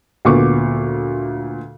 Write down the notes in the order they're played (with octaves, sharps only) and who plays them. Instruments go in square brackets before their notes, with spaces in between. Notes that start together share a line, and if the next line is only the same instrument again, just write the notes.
[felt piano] D2 A#2 B3 C#6 D6